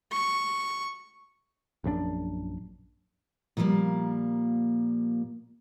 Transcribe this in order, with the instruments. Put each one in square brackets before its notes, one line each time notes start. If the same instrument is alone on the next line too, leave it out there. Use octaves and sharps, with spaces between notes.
[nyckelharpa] C#6
[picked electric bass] A#1 F#2 D#3 D4
[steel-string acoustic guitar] A#2 F3 G3 G#3 A#3